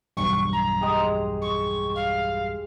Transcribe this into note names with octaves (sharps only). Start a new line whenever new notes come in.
B1 E2 G2 C#6
A#5
G#3 G4 G#4
C#6
F5